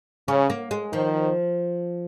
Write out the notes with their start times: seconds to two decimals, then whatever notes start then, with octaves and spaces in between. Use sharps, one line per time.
0.28 C#3 C#4
0.50 A#3
0.71 G#3
0.93 D#3 F3